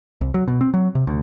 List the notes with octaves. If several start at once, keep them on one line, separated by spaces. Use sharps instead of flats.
C2
F#3
B2
C4
F#3
C3
D2